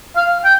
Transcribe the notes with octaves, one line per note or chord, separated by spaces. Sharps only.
F5
G5